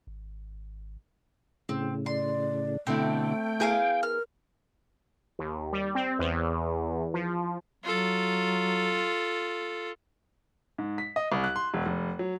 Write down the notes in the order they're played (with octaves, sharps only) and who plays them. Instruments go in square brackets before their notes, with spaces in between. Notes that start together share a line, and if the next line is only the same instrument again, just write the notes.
[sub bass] G#1
[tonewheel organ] A2 C#3 [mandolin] C4
[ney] D5 [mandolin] C6
[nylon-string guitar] B2 D3 E4 [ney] A3 [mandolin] C4 [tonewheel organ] G5
[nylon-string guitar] B3 E4 G#4 [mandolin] F5 G#5 G6
[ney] A#4 [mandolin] F6
[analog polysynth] D#2
G3
C4
E2
F3
[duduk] F#3 [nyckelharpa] F4 A4
[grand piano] G#2
B6
D#5
C2
F#6
C6
E1
F1
F#3